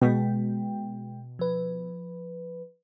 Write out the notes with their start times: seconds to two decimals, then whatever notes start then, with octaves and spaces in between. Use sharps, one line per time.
0.01 B2 G#3 G5
1.39 F3 B4